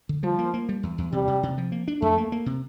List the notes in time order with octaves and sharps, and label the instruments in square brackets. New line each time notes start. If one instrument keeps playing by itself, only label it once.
[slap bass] D3
[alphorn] F3 [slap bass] G3
[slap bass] A#3
A#3
G3
E2
E2
[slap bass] C3 [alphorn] G3
[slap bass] C3
C3
F3
A#3
D4
[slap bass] F2 [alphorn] A3
[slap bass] A#3
A#3
C3